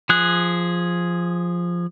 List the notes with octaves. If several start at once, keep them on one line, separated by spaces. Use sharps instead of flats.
F3 G#4 F#6